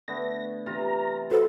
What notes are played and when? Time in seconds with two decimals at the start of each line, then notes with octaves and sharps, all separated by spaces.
0.08 D3 A3 B3 A#6
0.66 C3 E3 F4 A#5
1.31 F#4 A4 B4 C5